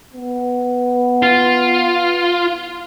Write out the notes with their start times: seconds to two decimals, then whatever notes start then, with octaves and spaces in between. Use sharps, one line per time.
0.13 B3
1.23 F4